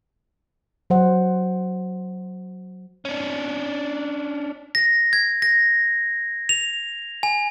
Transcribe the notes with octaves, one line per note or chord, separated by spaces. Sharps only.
F#3 C5 F#5
C#4 D4
A#6
G#6
A#6
F7
G#5